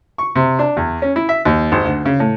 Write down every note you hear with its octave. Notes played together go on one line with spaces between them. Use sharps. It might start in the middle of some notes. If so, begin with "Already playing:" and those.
C#6
C3
D4
E2
C#4
E4
E5
D#2
G#1
D2
C#3
A2